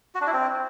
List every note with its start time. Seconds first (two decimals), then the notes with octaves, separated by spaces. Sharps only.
0.15 F#4
0.21 D4
0.27 E4
0.33 C4